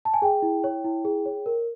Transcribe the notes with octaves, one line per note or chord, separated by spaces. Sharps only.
A5
G#5
G#4 G5
E4
C#5
E4
G#4
C#5
A#4